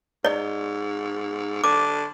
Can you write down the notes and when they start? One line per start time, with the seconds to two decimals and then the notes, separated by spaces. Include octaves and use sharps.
0.25 G#2 D5 D#5
1.64 D3 D6